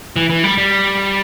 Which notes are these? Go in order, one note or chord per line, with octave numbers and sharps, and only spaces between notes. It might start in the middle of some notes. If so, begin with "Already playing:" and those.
E3
E3
G3
G3